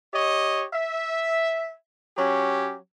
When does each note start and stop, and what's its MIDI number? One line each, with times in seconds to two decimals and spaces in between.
0.13 0.65 67
0.13 0.65 73
0.13 0.65 75
0.73 1.73 76
2.17 2.75 54
2.17 2.75 61
2.17 2.75 67